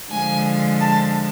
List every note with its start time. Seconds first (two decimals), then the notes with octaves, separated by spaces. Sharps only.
0.12 D3 F3 G#3 G#5
0.81 A5